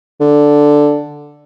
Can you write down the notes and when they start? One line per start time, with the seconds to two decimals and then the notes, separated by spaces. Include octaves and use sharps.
0.21 D3